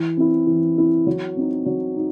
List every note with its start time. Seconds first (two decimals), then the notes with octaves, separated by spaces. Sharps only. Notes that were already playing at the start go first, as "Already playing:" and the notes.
Already playing: E3
0.17 C4 E4
0.47 E3
0.78 C4 E4
1.07 F#3
1.37 C4 D#4
1.66 F#3
1.97 D#4